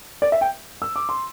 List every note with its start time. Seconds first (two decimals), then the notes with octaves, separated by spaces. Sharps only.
0.22 D5
0.32 E5
0.41 G5
0.82 E6
0.96 D6
1.09 C6